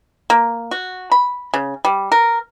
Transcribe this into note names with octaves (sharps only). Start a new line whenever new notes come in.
A#3
F#4
B5
C#3
G3
A#4